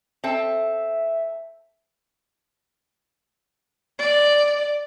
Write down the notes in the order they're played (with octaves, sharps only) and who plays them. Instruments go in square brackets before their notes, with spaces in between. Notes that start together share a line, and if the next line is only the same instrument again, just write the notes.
[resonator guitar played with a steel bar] C4 A4 [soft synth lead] E5
[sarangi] D5